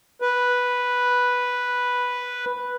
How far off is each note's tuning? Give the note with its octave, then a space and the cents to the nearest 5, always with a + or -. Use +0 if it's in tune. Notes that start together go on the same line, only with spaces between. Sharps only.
B4 -5